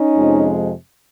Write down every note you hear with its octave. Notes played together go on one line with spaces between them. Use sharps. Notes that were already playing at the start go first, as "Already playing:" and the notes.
Already playing: C#4 D#4
F2 C3 F3 G#3